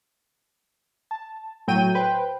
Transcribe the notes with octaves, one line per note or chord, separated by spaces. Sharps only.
A5
A2 F#3 G5 D#7
B4 C5 G5